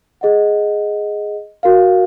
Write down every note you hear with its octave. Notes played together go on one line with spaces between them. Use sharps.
G#4 D#5 F#5
F#4 A#4 F5